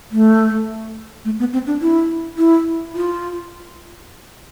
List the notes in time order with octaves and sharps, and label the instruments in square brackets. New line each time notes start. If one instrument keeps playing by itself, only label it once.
[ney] A3
A3
B3
C4
D4
E4
E4
F4